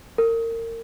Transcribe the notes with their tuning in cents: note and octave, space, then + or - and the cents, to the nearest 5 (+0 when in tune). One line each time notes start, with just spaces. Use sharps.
A#4 -30